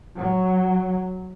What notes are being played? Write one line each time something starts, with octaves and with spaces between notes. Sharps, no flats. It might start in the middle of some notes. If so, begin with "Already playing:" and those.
F#3